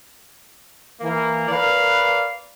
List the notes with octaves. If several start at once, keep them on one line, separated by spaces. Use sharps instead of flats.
E3 A#3
A#4 B4 D5 F5